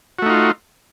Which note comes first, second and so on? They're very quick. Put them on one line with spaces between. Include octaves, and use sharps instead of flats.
F#4 A3 D#4 F4